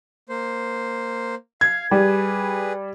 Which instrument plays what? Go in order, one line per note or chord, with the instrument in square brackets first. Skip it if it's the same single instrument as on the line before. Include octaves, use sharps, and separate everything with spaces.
[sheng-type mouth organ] A#3 C5
[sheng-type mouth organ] F5 [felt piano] G#6
[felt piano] G3 [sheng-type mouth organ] G#4 B4